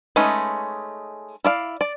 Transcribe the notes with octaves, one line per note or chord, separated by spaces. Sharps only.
G#3 A3 C#4 D#4 B4
E4 D5 F5
D5